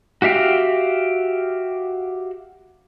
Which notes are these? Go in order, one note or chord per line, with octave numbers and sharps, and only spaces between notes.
F#4 G4 E5 F5 G5